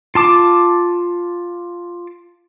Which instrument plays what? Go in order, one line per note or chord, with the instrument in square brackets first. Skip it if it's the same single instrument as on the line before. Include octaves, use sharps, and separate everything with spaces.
[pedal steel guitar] F4 A5 D6